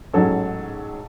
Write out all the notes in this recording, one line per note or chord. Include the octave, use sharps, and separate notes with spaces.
A1 G#2 F#3 C#4 A4